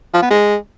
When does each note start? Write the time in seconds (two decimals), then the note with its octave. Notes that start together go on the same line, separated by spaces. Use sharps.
0.14 F3
0.22 B3
0.30 G#3